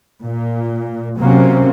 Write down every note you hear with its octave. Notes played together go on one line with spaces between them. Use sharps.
A#2
C3 F#3 A#3 C4 C#4